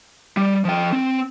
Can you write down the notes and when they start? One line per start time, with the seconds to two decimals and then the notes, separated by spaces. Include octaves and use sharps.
0.37 G3
0.65 F3 G5
0.93 C4